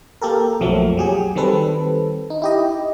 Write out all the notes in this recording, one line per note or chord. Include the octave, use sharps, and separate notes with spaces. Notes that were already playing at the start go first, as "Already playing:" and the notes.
A#3 G4 A4 A#4
B1 F2 F3 F#3 A3 A#3
F#3 G4 G#4
D#3 G3 C4 A4 B4
D#4
E4 G4 D#5